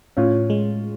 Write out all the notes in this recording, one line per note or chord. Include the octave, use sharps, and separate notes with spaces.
A2 C#4 F4
G#3